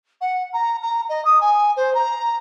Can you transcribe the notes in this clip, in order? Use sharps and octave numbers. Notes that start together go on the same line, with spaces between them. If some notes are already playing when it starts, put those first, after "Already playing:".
F#5
A#5
A#5
D#5
D#6
G#5
C5
A#5